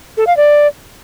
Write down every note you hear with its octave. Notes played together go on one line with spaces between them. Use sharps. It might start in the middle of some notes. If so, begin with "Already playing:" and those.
A4
F5
D5